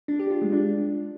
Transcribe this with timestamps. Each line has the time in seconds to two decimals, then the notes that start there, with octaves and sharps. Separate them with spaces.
0.08 D4
0.19 G4
0.30 F4
0.42 G#3
0.53 D4